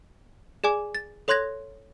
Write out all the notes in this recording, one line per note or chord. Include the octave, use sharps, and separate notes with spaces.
G#4 D5 G#5 D6
A6
A4 C#5 C6 F#6 G#6 A#6